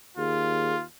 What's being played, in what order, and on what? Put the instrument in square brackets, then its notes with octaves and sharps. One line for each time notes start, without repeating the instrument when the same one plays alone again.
[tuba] D#2 [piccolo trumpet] F4 [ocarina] G#4